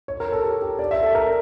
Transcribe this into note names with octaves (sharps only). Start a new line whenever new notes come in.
C#5
A#4
A4
G4
G4
D5
E5
A4
A#4